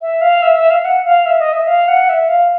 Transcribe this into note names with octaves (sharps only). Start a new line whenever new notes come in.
E5
F5
E5
E5
F5
F#5
F5
E5
D#5
E5
F5
F#5
E5
F5